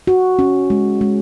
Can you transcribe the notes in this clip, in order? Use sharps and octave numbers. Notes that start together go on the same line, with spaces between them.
F#4
C#4
G#3
G#3